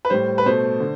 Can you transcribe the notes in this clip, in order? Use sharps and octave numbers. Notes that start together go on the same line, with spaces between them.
B4
A2 G3 C5
B4
B2 A3 C5
D3